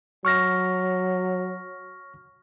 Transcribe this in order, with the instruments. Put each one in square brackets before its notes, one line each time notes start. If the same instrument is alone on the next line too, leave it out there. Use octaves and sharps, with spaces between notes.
[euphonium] F#3 [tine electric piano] C#6 F6 A#6